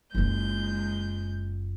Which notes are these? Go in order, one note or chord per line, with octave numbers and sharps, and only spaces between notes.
F#1 G#3 F4 G6